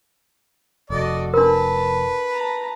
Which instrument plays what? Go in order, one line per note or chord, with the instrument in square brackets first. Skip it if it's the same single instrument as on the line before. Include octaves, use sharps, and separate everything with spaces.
[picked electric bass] F1 [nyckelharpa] F#4 A4 [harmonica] D5 D#5
[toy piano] D4 A#4 [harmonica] B4 [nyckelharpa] A5
[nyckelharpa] A5 A#5